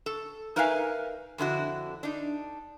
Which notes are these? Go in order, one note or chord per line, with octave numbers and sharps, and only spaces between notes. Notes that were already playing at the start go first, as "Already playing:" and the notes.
A4
D#4 A#4 B4 E5 F5 G#5
F2 D3 E4 F#4
D4 D#4